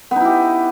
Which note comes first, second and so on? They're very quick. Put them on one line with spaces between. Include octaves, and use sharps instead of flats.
B3 D#4 E4 G4